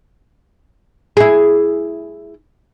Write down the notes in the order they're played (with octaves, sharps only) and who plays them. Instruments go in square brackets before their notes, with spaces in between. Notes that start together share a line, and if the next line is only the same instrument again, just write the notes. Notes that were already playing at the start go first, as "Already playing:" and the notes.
[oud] E4 G#4